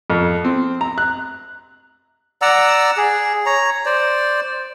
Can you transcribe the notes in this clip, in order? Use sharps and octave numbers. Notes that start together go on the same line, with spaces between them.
F2
C4
A#5
F#6
D5 F#5 A#5 E6
G#4
C#5 A#5
C5 D5